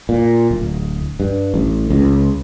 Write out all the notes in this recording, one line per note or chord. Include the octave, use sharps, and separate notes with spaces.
A#2
D1
G2
A1
C#2